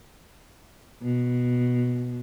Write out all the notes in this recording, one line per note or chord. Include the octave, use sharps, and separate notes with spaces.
B2